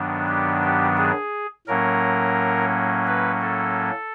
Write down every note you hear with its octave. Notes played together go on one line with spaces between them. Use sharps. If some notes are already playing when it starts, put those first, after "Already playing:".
Already playing: G2 D#3 F#3 B3 D4
G4
G4
G#4
A2 F#3 A#3 C#4 A#4
B4
A4